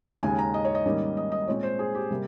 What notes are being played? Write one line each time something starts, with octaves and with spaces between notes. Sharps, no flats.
D#2 C#3 G#3 G#5
A#5
D#5
C#5
D#5
G#2 D#3 G3 A#3 C#4
D#5
D#5
A#2 G#3 C4 C#5
C5
G#4
G4
C3 G3 A#3